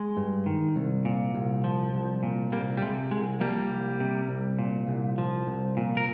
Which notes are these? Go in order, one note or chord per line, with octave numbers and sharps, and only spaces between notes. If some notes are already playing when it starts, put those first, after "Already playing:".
Already playing: G#3
G2
D#3
C2
A#2
C2
F3
C2
A#2
C2 G3 A#3
G3
C3 G#3
C2 G#3
F3 G3 A#3
C2
C3
C2
A#2
C2
F3
C2
A#2
A#4